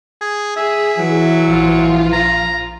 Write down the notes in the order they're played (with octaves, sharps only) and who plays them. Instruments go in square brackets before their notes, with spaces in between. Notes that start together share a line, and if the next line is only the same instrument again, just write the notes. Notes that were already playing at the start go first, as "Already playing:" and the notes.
[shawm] G#4
[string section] G#4 [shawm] E5
[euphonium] E3 [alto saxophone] F#3
[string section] A#1 F3 F4
[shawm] A#5